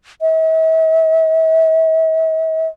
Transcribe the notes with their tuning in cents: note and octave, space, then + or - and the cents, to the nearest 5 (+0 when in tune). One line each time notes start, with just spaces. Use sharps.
E5 -45